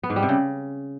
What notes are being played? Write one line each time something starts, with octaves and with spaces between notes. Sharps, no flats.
B3
G#2
G3
C3
C#3